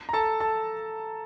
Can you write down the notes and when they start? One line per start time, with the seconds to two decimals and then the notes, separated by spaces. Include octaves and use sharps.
0.09 A#5
0.13 A4 A5
0.40 A4 A5